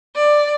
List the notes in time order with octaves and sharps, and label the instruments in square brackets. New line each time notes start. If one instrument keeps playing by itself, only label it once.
[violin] D5